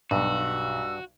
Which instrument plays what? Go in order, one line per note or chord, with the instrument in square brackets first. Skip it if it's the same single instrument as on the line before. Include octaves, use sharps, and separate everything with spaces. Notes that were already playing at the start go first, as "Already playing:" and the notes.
[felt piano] B1 [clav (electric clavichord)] G2 [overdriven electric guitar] F#4 [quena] E6